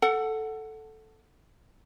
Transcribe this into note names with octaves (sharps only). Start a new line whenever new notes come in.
A4 F#5